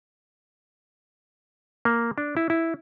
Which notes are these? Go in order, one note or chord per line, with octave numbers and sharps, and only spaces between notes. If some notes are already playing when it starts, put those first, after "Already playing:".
A#3
D4
E4
E4